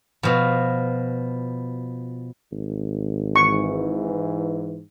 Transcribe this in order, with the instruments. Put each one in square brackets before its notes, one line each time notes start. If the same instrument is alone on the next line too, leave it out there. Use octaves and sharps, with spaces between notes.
[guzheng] B2 F3
[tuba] G#1
[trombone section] G#2 E3 [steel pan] C#6